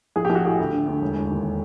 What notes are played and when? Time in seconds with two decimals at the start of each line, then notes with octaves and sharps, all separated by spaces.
0.16 A#1 G#4
0.25 G4
0.30 A#1
0.35 F#4
0.45 A2 G4
0.59 D2
0.72 D3
0.88 D2
1.02 E1
1.15 E1
1.31 D#2